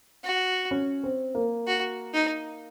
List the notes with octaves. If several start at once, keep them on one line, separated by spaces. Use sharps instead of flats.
F#4
C#4
C4
A#3
F#4
D#4